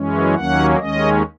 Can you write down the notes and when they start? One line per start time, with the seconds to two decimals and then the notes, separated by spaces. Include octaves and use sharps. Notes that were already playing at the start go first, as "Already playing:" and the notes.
Already playing: F#2 E3 G#3 C#4
0.35 D#2 D#3 F#3 A#3 C#4 F#5
0.78 D#2 D#3 G#3 C#4 D#5